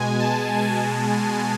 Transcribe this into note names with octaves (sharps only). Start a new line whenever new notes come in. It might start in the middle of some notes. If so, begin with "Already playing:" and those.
Already playing: B2 G#3 G#5
A5
G#5